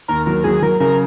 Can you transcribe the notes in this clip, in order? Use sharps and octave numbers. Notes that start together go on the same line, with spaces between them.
D#2 A#4
F#3 A#4
F#3 G#4
F#3 A#4
C#3 A#4